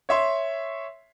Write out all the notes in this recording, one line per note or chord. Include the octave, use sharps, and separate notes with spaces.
C#5 E5 C6